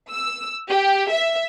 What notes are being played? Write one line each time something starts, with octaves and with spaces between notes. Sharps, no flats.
E6
G4
E5